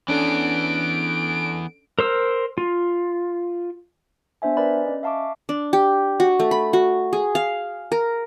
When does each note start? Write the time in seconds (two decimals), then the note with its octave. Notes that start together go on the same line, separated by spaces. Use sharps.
0.08 E3 B3 C#4 D4 A4 D7
1.99 A#4 C5 E6
2.58 F4
4.42 B3 D4 C5 E5 G#5
4.57 A#4 B4 D5 G#5 B5
4.86 C#4 D#5
5.03 E5 F5 A5 C#6 D6
5.49 D4
5.73 G4
6.20 F#4
6.40 A3
6.51 B5
6.73 F#4
7.13 G#4
7.35 F5
7.92 A#4